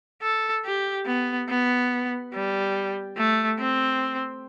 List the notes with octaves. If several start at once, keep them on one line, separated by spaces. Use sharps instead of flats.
A4
G4
B3
B3
G3
A3
C4